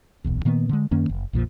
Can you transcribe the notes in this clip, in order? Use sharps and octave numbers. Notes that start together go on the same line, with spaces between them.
D#1 B1 E2
A#2 D#3 A#3 B3
D3 G#3
F#2 D#3 A#3 C#4
F#1
A#1 F2 A#2 F3